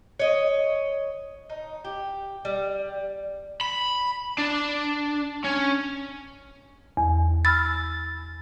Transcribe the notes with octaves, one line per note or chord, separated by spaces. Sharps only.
C#5 D#5
D#4
G4
G3
B5
D4
C#4
E2
B5 E6 F6 A6